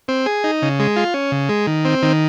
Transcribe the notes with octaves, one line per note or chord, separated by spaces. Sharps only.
C4
G#4
D#4
C#3
G#3
F4
C#4
C#3
G#3
D#3
C4
D#3